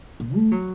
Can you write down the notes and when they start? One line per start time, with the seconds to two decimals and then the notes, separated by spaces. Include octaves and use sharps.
0.20 A#2
0.35 A3
0.52 F#3